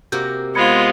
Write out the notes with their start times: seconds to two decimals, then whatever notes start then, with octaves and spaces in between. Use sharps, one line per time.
0.12 C3 A#3 F#4 G6
0.55 G#3 B3 F4 C5 B5 G#6 C#7